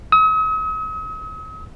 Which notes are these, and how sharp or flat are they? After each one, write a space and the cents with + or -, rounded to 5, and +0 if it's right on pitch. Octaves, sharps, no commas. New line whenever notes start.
D#6 +45